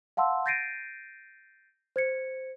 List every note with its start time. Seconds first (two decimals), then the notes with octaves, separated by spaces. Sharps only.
0.17 F5 F#5 A5 C6 E6
0.46 G6 A6 A#6 C7 D7 D#7
1.96 C5 G#6 C#7